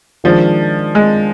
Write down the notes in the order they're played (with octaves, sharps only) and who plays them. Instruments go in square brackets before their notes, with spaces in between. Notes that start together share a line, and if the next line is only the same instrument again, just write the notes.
[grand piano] D#3 G#3 D4 G#4 [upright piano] F3
[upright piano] G#3